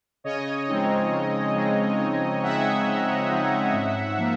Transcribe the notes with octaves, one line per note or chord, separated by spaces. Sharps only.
C#3 C#5 D#5
F3 G#3 C4 D#4
C#3
F3 G#3 C4 D#4
C#3
F3 G#3 C4 D#4 E5 F#5
C#3
F3 G#3 C4 D#4
G#2
F3 A#3